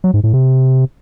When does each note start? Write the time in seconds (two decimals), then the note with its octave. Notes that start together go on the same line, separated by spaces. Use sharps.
0.04 F#3
0.14 G#2
0.24 A2
0.34 C3